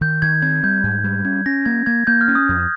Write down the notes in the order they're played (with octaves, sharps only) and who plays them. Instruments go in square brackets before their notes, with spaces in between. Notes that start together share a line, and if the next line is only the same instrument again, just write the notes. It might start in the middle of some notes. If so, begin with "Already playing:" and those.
[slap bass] D#3 [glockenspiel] G6
[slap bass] D#3 [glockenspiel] G#6
[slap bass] C4 [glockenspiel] G#6
[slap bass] G3 [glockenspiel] G6
[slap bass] G#2
G3
[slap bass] C#4 [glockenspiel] G#6
[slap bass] C#4 [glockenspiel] A#6
[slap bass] A#3 [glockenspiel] G#6
[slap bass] A#3 [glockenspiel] G#6
[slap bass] A#3 [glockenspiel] G6
[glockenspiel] F6
[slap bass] C#4
[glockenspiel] D#6
[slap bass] F2